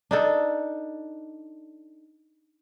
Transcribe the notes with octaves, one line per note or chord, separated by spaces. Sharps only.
D4 D#4 A4